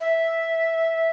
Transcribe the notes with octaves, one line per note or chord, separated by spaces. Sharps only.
E5